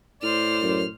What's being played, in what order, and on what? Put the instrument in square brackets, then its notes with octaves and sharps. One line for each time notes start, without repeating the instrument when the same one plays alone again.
[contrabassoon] A2 [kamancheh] C5 D5 [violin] F6
[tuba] F#2